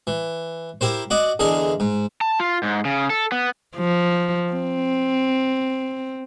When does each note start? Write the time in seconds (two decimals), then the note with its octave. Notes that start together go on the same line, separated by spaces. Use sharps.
0.07 E3
0.81 E4 G4 A#4 C5
1.10 F#4 D5 D#5
1.39 E2 D3 G#4 A#4 D#5
1.80 G#2
2.21 A5
2.40 F4
2.63 G#2
2.85 C#3
3.10 A4
3.32 B3
3.76 F3
4.53 C4